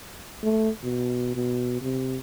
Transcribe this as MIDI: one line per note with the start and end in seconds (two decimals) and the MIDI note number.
0.43 0.70 57
0.83 1.33 47
1.35 1.81 47
1.82 2.17 48